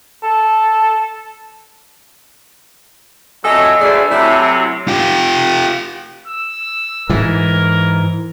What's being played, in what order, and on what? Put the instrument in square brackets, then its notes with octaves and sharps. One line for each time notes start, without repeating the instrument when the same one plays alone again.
[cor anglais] A4
[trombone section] F2 A2 F#3 [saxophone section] A4 D#5 [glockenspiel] G#5 E6
[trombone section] D2 [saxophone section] A3 G#4 D5
[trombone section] C3 F#3 [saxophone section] A3 E4
[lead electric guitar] F4 G4
[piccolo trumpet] E6
[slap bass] G#2 E3 [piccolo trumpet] A#4